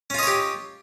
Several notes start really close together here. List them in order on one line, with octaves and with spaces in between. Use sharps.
C#4 F4 D#5 C#5 G4